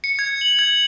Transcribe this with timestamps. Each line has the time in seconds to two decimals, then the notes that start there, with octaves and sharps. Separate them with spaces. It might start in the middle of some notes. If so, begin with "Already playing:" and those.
0.04 C#7
0.19 G#6
0.41 F#7
0.59 G#6